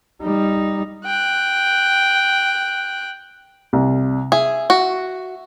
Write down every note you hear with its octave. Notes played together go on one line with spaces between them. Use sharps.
G3 D#4
G5 F#6
C2
G#4 E5
F#4